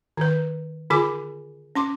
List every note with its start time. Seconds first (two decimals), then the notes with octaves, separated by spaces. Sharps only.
0.17 D#3 B4
0.90 D3 F4 G#4 G#5 D6
1.75 C#4 C6 D6